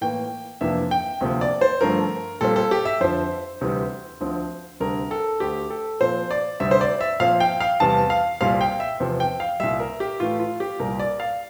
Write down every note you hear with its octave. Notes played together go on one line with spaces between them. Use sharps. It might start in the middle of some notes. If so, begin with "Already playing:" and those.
A2 E3 A#3 G5
F2 C3 E3 A#3 D4 E5
G5
D2 C3 F3 A#3
D5
C5
G2 D3 F3 A3 C4 A#4
A#2 G3 C4 A4
A4
G4
E5
F2 D3 F3 C5
D2 C3 E3 G3
D2 D3 F3 C4
D2 C3 G3 D4 A#4
A4
D2 D3 A3 G4
A4
A#2 F3 C4 C5
D5
D2 C3 G3 C4 E5
C5
D5
E5
A#2 F3 C4 F5
G5
F5
E2 C3 G3 A5
F5
C2 A#2 G3 C4 F5
G5
E5
E2 C3 F3 C4
G5
F5
C2 A#2 G3 E5
A#4
G4
A2 E3 A3 F4
F4
G4
C2 A#2 G3 A#4
D5
F5